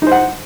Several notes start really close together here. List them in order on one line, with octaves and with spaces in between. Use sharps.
D#4 C5 F#5